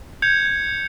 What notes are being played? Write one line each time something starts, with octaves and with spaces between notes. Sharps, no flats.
G6 G#6 C#7 F7